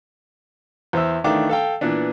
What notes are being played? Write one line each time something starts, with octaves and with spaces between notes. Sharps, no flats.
E2 C5 E5 E6
D#3 E3 A3 D4 F5 D6
A4 F5 G5
A#2 E3 B3 D4